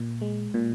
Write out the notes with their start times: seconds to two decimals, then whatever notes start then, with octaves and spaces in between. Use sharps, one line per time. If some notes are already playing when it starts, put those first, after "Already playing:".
Already playing: A#2
0.21 G#3
0.54 A#2